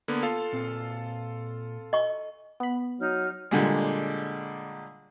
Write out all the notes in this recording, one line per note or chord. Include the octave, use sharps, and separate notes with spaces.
D3 A#3 B3
F4 A4 F5
A#2 C4
D#5 C#6
B3 B5
F#3 D#4 F6
A#2 D3 G3 G#3